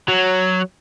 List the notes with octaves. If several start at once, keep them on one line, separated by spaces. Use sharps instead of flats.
F#3